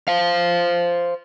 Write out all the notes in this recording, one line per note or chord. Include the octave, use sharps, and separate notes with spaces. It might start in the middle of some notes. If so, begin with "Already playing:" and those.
C5 F5